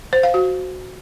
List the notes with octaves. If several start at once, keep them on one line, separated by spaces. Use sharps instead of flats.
C5
F5
F#4